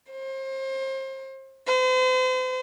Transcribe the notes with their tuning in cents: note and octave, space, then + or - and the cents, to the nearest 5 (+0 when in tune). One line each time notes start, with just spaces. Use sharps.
C5 +30
C5 -40